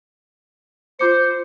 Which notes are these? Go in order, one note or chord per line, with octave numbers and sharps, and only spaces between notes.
F4 C5 D6 C#7